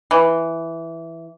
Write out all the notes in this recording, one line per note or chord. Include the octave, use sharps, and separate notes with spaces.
E3